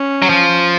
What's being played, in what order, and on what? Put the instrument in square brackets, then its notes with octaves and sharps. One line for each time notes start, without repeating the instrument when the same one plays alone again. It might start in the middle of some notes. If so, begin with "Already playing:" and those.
Already playing: [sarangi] C#4
[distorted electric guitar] F#3
F3